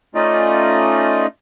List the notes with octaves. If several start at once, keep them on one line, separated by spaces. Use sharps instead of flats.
A3 C#4 D#4 F4 D5 D#5